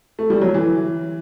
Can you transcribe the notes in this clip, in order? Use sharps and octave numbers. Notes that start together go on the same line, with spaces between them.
A3
G3
F#3
E3